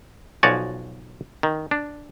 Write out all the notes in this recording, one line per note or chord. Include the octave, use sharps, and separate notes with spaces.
B1 F3 F#4 C#5 D5 G#5
D#3
D4